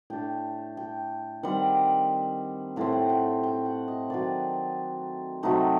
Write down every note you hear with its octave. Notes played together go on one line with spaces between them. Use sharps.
A2 A3 D4 G5
G5
D#3 G3 C4 F#5
A2 A3 C4 F#5
F#5
G5
G5
F#5
D#5
D#3 F#3 C4 D5
C3 F#3 A3 D#4